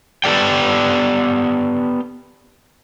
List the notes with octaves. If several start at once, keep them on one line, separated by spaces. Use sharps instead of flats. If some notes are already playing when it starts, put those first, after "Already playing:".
B3 G4 A4 D5 G5